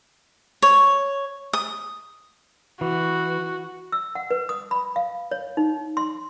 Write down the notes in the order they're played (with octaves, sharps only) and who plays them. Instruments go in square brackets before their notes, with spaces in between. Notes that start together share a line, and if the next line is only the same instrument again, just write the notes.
[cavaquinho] C#5
D#6
[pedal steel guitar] E3 [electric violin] F#4
[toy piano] E6
F#5
B4
D#6
B5
F5
C#5
D#4
C6